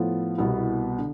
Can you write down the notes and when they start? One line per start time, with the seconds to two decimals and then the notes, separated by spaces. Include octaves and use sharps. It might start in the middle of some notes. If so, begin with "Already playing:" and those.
Already playing: A2 F3 B3 F4 A4
0.38 C2 B2 B3 E4
0.98 D3